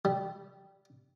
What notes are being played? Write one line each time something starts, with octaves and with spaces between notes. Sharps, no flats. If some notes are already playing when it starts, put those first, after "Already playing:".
G3